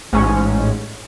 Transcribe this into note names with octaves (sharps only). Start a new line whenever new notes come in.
A1 G#2 C#4